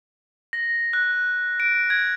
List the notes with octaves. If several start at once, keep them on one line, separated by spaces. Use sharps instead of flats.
A#6
F#6
D7
G#6